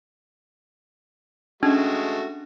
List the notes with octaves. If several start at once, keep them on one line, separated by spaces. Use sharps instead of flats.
G#3 A3 C#4 D4 F#4